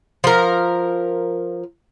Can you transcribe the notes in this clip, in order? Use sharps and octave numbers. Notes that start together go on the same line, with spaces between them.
F3 A#4